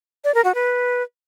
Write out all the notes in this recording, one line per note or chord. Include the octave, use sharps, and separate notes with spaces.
D5
A#4
F#4
B4